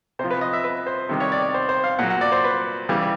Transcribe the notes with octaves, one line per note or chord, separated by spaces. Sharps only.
C3 F3 C5
B4
D#5
E5
B4
C5
C3 D#3 G3
C#5
D5
D5
C5
C5
F5
A#2 F#3 F#5
F#5
D5
C5
B4
C#3 E3 G3